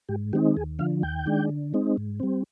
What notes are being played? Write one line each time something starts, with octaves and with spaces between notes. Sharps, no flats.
G#2 G4
D#3 G#3 C4 D#4 G4
D#2 G#4
D3 F3 F5
D#2 G5
D#3 G#3 D4
D3
G#3 C4 D#4
G#2
G3 C4